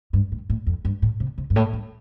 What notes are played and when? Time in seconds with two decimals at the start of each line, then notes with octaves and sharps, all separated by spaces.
0.13 G2
0.32 A2
0.50 A2
0.67 F2
0.85 G2
1.02 A2
1.20 C3
1.38 C3
1.50 G2
1.56 A2
1.73 G2